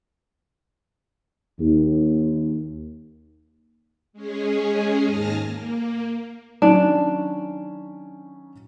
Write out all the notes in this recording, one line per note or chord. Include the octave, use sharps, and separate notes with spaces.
D#2
G#3 C#4 G#4
D#2 G#2 G#5 A5 F6 A#6
A#3
D#3 F#3 C#4 D4